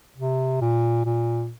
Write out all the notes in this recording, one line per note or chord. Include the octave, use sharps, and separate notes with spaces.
C3
A#2
A#2